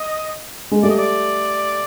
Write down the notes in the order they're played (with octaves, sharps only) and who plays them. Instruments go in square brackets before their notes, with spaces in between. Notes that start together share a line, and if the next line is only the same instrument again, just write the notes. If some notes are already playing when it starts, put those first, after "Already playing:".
Already playing: [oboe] D#5
[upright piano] G#3
[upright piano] G3 A3 [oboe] D5
[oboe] D#5
D5